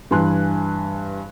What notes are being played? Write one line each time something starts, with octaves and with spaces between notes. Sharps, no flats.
G2 E3 G#5 C6 F#6